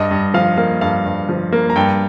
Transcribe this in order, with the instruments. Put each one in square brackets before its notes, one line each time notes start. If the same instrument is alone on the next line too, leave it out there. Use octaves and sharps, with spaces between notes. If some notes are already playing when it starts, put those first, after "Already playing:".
Already playing: [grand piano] G2 D#5
G2
F3 F5
A#3 F5
G2 F5
G2
F3
A#3
A#5
G2 G5